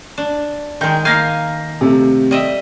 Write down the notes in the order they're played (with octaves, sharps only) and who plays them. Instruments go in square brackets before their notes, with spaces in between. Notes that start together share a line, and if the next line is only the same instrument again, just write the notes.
[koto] D4
[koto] D#3 G#3 [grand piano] A#4 G5 G6
[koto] A#3 F5 G#5 [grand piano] G6 A#6 C7
[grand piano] C3 A3
[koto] G3 D#5 E5